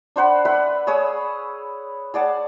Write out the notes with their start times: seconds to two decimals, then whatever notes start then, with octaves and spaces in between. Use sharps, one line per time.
0.16 D4 C5 F#5 B5
0.45 B4 E5 F#5
0.87 G#4 C#5 D#6 E6
2.14 G#4 D5 F#5 A5